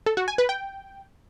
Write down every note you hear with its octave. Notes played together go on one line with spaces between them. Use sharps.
A4
F#4
G#5
B4
G5